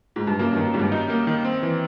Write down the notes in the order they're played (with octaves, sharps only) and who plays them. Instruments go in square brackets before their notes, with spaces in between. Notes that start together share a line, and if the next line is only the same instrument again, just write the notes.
[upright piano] G#2
G2
[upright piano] F#2 [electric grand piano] A#3
[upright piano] G2
[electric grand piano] D#3
[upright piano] F#2
[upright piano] G#2 [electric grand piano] G3
[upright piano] G2
[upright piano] F#2 [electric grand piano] D#4
[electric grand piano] A#3
D#3
C4
E3